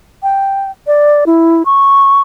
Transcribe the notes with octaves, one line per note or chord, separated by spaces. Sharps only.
G5
D5
E4
C#6